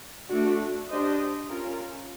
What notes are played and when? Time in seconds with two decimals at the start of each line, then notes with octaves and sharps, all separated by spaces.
0.29 A3 D4 F#4
0.88 D4 G4 C5 D#5
1.48 C#4 F4 A#4